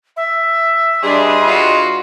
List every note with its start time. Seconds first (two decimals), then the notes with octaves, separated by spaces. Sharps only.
0.16 E5
1.03 G3 D4 G#4 B4 D#5 C6
1.44 F4 F#4